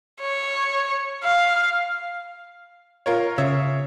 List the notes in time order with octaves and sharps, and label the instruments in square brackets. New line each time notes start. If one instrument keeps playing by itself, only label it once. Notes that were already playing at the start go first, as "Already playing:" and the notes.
[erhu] C#5
F5
[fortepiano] F4 A#4 C#5
[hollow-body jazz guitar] C#3 [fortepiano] C#5 E5